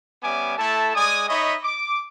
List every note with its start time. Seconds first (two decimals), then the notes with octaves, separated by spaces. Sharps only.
0.23 G3 B3 C#4 E5 G#5 D6
0.58 A3 E4 A4 A5
0.95 G#3 D5 G#5 D#6
1.29 D#4 C#5 D#5 E5 B5 C#6
1.64 D6